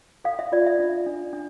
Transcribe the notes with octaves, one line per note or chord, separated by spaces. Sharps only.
A4 F5
E5
F4 D5
E5
D4
D4
D4